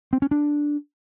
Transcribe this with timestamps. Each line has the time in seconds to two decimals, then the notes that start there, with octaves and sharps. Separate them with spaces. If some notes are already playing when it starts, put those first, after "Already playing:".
0.13 C4
0.22 C#4
0.31 D4